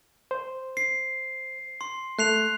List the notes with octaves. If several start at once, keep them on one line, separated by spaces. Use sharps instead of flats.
C5
C7
C6
A3 F#6 C7 F7